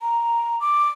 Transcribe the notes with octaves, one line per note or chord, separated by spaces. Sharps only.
A#5
D6